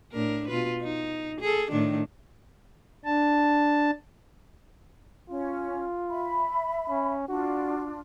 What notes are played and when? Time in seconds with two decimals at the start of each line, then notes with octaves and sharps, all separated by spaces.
0.13 A2 D4 A#4
0.48 B2 F4 B4
0.81 D#4
1.40 G#4 A4
1.71 A2 D#3 D4
3.05 D4 A5
5.29 C#4 F4
6.10 E5 B5
6.89 C#4
7.28 D4 F4 F#4